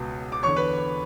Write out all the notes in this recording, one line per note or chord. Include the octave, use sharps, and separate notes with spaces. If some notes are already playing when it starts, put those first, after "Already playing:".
Already playing: C#2 B2
D6
E2 D3 C#5 C#6
B4 B5